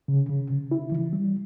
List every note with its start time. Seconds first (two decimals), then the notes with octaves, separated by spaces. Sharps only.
0.08 C#3
0.29 C#3
0.51 C#3
0.71 E4
0.92 E3
1.13 G3